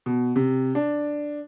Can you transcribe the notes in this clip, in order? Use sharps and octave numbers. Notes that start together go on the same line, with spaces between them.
B2
C3
D4